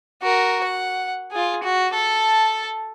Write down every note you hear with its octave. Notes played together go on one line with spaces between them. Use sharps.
F#4 A#4
F#5
F4 G#4
F#4
A4 A5